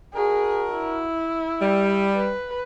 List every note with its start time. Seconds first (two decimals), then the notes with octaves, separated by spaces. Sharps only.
0.14 D4 F#4 G#4 A#4
0.71 E4
1.60 G3
2.16 B4